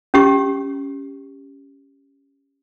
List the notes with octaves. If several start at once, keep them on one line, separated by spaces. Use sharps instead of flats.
C#4 G4 C#6